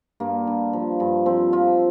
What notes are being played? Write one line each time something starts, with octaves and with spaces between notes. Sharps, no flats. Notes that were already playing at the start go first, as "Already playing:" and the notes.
G2 A#3
G2
F3
G2
F3 C4
F3 F4